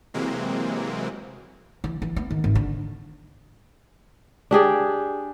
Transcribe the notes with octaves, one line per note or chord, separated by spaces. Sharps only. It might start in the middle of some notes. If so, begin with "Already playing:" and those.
C3 E3 F#3 G#3 A#3 C4
E3
E3
B3
D#3
G#1
D3
D4 G4 G#4 D5